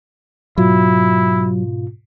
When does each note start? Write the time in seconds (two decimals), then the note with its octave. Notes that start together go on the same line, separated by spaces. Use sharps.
0.58 G#2 B2 F#3 E4 F4